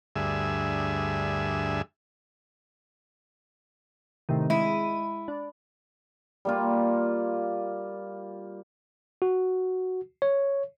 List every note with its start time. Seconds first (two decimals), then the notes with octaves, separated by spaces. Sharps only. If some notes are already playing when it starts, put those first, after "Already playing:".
0.16 D2 G2 G#4 E5
4.29 A2 C3 D#3
4.50 G#3 E4 D#7
5.28 D4
6.45 G3 A#3 F4
9.22 F#4
10.22 C#5